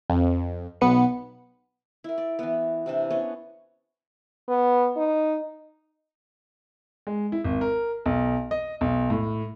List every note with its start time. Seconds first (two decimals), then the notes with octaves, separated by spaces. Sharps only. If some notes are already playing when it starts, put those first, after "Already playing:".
0.10 F2
0.81 B1 B3 B4 C#7
2.04 E4 A#4
2.18 D5
2.39 E3 B3
2.86 C3 E3 D4
3.10 B3 C#4 D4 C#5
4.48 B3
4.97 D#4
7.07 G#3
7.32 E4
7.44 G#1
7.61 A#4
8.06 B1
8.51 D#5
8.81 B1
9.10 A2